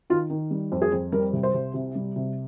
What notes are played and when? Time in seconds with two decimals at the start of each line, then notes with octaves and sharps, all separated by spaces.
0.10 D#3 F4
0.30 D#3
0.51 G3
0.72 F2
0.82 G#4
0.92 F2
1.12 G3 A#4
1.33 C2
1.43 C5
1.54 C2
1.74 C3
1.95 G3
2.16 C3